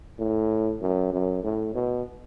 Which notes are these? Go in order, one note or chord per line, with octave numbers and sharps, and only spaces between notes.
A2
F#2
F#2
A2
B2